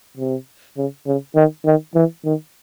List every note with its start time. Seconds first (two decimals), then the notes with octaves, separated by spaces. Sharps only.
0.18 C3
0.77 C#3
1.07 C#3
1.36 D#3
1.65 D#3
1.95 E3
2.25 D#3